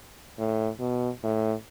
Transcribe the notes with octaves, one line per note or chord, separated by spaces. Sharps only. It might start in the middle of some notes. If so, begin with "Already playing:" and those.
A2
B2
A2